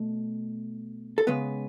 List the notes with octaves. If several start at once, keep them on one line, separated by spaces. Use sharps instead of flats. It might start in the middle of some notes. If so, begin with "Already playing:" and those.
Already playing: B2 A3
A4
C#3 G#3 B3 B4